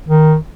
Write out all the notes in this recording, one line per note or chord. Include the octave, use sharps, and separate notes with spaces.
D#3